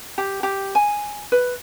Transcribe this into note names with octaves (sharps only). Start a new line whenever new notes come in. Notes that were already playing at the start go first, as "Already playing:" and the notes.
G4
G4
G#5
B4